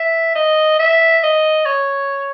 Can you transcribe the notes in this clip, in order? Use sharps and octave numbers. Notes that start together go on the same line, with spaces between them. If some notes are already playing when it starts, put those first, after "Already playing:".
Already playing: E5
D#5
E5
D#5
C#5